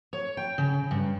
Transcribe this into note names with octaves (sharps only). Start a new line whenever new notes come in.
C#5
G5
C#3
G2